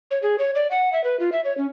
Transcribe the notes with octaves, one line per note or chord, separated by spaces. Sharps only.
C#5
G#4
C#5
D5
F#5
E5
B4
F4
E5
C#5
C#4